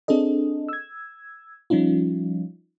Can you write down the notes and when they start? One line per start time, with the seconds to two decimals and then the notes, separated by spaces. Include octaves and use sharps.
0.08 C4 D4 G#4 A4 D#5
0.69 E6 G#6
1.70 F3 G3 C#4 D#4 F4